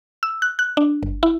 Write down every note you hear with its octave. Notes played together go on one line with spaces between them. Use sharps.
E6
F#6
F#6
D4
G1
E4